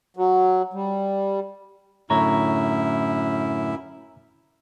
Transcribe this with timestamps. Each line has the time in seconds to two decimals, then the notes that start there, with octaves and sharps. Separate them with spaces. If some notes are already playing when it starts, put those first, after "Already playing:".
0.16 F#3
0.74 G3
2.10 F#2 A2 D3 E4 C#5 A#5